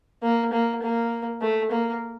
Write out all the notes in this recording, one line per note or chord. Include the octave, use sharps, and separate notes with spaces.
A#3
A#3
A#3
A3
A#3